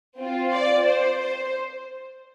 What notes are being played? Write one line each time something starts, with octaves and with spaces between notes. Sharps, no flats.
C4 F4
D5
C5
C5